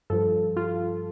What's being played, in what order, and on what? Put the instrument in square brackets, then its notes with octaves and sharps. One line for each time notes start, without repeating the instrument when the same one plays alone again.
[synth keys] G2 F3 A4
F4